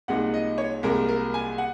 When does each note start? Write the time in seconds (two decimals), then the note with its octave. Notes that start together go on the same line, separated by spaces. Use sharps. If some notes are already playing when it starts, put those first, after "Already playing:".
0.08 C2 A#2 G#3 D#4 F#5
0.34 D#5
0.58 C#5
0.83 C2 A#2 G#3 A#4
1.09 A#4
1.34 G#5
1.58 F#5